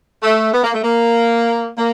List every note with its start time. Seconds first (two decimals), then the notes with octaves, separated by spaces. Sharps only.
0.23 A3
0.54 B3
0.64 A#3
0.74 A3
0.84 A#3
1.78 A#3